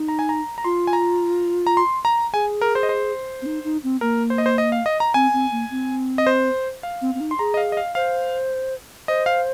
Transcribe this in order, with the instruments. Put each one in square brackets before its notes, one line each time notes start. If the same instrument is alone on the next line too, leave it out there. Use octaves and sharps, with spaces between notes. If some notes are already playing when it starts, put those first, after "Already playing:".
Already playing: [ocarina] D#4
[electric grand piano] A#5
G#5
A#5
A#5
[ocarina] F4 [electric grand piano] C6
[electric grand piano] G#5
A#5
A#5
C6
A#5
[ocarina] G#4 [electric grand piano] G#5
[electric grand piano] A#4
C5
D#5
C5
[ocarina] C4
D#4
D#4
C4
[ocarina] A#3 [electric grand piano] A#4
[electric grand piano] C5
D#5
C5
D#5
F5
D#5
A#5
[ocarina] C4 [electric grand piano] G#5
[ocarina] C4
A#3
C4
[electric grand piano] D#5
C5
F5
[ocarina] C4
C4
D#4
[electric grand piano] C6
[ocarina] G#4 [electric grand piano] A#5
[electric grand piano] D#5
F5
D#5
F5
[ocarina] C5 [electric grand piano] F5
[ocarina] C5 [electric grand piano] D#5
[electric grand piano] F5